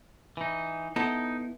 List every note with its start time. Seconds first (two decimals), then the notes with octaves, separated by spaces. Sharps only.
0.37 E3 D#4
0.96 B3 D#4 E4 A4